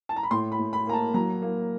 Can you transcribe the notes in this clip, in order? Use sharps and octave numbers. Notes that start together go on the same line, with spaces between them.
A5
A#5
B5
A2 C6
B5
A2
B5
A#3 A#5
A5
F#3 A#5
A#3